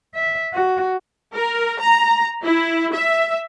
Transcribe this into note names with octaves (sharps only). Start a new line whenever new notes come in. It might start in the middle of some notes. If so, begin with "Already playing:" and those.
E5
F#4
A#4
A#5
E4
E5